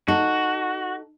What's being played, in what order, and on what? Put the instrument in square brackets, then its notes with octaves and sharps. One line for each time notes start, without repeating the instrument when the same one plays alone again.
[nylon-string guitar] D#4 A4 [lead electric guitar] F#4